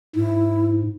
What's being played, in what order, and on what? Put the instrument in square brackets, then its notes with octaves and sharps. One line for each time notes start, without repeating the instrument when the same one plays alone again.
[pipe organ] G#2 [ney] E4